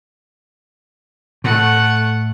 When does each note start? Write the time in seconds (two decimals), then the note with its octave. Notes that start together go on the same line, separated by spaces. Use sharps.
1.44 A2 A3 F#5